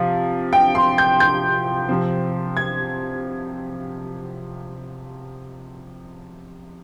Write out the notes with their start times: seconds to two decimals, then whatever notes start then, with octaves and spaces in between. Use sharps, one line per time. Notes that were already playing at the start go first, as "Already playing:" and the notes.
Already playing: C3 F3 F5
0.53 G5
0.75 C6
0.98 G6
1.20 G6
1.89 C3 F3 C4
2.57 G#6